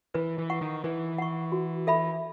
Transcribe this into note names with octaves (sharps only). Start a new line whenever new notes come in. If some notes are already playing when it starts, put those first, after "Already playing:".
E3 B4
E3
F#5 C#6
D#3
E3 B4
F#5 C#6
F#4
A4 E5 B5